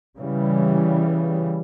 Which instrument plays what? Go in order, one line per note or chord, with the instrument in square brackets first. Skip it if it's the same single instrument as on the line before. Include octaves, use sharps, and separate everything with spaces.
[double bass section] C#3 E3 G3